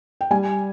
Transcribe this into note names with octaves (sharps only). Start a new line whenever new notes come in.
G5
G3 G#5